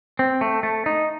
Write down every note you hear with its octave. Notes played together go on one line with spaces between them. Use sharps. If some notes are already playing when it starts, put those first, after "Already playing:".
C4
A3
A3
D#4